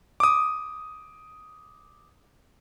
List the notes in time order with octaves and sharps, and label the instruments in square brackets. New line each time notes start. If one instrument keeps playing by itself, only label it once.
[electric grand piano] D6 D#6